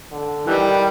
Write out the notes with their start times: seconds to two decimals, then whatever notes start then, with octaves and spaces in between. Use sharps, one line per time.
0.12 D3
0.47 D#3 E3 G3